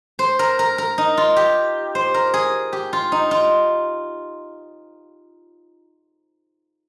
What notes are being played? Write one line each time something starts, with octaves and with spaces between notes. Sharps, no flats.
C5
A#4
A#4
A#4
D#4
F4
G4
C5
A#4
G#4
G4
F4
D#4
F4